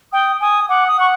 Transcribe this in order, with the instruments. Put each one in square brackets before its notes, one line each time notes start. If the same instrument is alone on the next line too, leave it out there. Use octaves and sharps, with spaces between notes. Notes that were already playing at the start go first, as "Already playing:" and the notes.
[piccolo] G5 [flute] D#6
[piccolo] G#5 [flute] D#6
[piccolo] F#5 [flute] D6
[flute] D#6
[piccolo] F#5 [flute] C#6